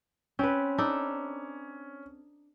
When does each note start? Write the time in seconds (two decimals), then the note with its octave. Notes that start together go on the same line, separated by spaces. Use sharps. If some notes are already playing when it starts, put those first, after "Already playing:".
0.39 C4 C#4 B4
0.78 D4 D#4 A4